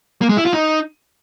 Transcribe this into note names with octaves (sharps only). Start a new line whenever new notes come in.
A#3
G#3
E4
F4
D#4